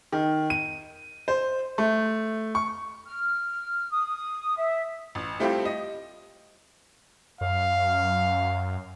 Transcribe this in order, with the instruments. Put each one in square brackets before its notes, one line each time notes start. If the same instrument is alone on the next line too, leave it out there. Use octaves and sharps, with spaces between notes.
[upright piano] D#3
D#7
C5
A3
C#6
[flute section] F6
D#6
E5
[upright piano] A1
G3 A3 C4 E4 F4 G4
D#5
[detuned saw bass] F#2 [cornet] F5